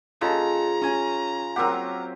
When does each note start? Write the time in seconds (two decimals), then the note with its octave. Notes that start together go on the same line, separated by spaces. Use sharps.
0.21 C#3 F4 A4 D#5 A5 A#5
0.82 C#4 G#5
1.56 F#3 C4 G4 A#4 F#5